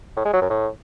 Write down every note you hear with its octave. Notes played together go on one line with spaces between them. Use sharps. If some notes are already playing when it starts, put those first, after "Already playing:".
A2
G#3
F#3
F#2
A2